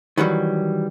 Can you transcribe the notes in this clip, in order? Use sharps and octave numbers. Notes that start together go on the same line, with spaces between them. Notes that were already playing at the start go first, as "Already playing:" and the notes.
D#3 E3 F#3 G3